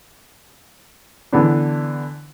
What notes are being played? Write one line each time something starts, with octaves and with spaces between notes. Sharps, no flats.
D3 E3 B3 D4